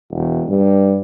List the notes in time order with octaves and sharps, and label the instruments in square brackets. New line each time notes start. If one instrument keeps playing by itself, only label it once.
[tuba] E1
G2